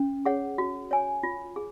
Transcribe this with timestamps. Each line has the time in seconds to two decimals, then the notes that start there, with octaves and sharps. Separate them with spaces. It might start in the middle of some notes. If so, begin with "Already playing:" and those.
Already playing: C#4
0.25 G#4 C#5 F#5
0.58 F#4
0.91 C#5 G#5
1.23 F4
1.56 G#4